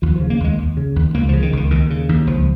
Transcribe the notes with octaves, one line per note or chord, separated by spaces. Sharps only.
D#2 F3
F3
C#3
A#3
D#2 G#3
D#2
C#3
D#2
C#2 A#3
F3
C#3
D#3
C#2 D#3
D#2 D#3
C#3
D#2
C#2 F3